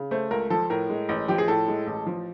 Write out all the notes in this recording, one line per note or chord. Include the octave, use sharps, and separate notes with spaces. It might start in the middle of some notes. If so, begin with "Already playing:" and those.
Already playing: C#3
A3 C5
C#2 A#4
F3 A4
A2 A#4
G#3
A1
F3 G4
G#4
A2 A4
G#3
A1
F3